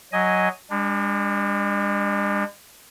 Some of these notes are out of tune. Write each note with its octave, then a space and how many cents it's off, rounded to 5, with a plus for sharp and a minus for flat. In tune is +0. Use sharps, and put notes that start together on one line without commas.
F#3 +0 D#5 +0 G#5 +0
G#3 -45 D4 +5